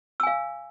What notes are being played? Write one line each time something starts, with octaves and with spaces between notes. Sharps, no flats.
F5 G#5 E6